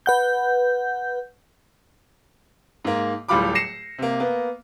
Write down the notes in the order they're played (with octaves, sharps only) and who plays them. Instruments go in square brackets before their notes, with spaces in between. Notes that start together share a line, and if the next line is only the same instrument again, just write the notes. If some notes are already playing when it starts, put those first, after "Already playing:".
[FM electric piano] B4 F#5 G6
[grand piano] G#2 A#3
D1 A2 G3 F4 B5 D6
A#6 C7 C#7 E7
C3 A#3
A#3 B3